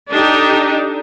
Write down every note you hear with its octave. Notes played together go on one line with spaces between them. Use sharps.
D4 D#4 G4 A4